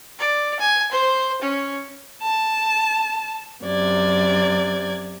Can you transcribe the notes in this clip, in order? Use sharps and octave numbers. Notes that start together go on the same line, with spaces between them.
D5
G#5
C5
C#4
A5
F#2 C3 D5 G#6